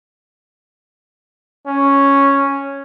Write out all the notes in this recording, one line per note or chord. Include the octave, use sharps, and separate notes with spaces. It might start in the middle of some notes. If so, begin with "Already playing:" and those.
C#4